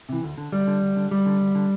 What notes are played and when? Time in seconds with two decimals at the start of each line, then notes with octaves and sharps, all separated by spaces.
0.09 C3 E3
0.23 D2
0.38 D3
0.52 D2 G3
0.67 D3
0.82 D2
0.97 D3
1.11 D2 G3
1.26 D3
1.41 D2
1.55 D3